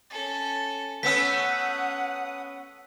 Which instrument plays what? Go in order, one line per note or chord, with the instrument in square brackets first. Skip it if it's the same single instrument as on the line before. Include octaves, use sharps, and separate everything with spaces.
[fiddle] C#4 A4
[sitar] A3 B3 C#4 [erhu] F#5 [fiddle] D#6 [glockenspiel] E6 B6